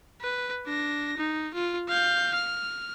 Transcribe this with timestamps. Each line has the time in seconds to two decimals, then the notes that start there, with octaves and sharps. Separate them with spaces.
0.21 B4
0.66 D4 A#6
1.18 D#4
1.54 F4
1.89 F5 G6
2.34 F6